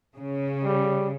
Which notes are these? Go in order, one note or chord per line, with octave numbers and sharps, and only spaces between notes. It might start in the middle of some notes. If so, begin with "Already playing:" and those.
C#3
G3